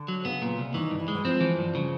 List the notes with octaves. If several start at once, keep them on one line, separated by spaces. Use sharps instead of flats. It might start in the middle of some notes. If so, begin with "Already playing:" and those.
Already playing: D3
F#3
C#3 B3
A#2
C2
D#3 E3
G2
E3
G#3
E3
F3 C4
E3
G2
C#3